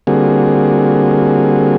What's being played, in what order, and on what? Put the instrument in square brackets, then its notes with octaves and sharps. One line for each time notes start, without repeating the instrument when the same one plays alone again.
[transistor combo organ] D3 G3 A#3 C4 F#4 G#4